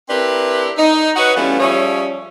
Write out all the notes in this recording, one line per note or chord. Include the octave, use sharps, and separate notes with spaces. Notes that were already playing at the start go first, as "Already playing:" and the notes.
C4 D4 E4 G4 A#4 B4
D#4
F#4 B4 C#5 D#5 F#5
E3 G3 A3 B3 C#4 F4
F3 G3 C#4 G#4 C#5 E5